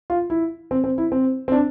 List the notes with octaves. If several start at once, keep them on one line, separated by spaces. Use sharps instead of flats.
F4
E4
C4
C4
E4
C4
C4
D4